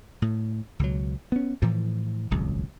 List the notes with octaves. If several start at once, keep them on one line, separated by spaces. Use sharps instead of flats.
A2
C#2 B2 F#3
B3 C#4
A2 E3 F3
D#1 G#1 C#2 F#3